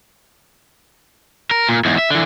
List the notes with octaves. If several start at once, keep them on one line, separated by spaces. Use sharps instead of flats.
A#4
A#2
E2 G#2
E5
D3 E3